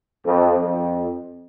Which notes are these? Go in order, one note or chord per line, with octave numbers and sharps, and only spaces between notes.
F2
F2